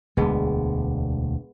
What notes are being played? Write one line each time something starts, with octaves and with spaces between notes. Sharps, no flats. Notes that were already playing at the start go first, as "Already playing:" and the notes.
E1 D2 G#3 B3 D4